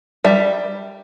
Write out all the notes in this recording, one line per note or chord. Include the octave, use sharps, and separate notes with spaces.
G3 E5